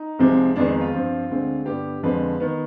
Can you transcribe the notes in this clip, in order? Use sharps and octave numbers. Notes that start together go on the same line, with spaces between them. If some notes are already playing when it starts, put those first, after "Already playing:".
Already playing: D#4
C2 C3 F3 G#3 C4
F2 D#3 G#3 B3 D4
D#4
F4
G2 F3 C4
D2 D3 G#3 C4
G2 D3 G3 B3 G4
F2 D3 F3 G#3 B4
D#3 B3